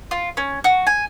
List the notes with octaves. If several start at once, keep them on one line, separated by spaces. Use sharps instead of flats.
F4
C#4
F#4
G#5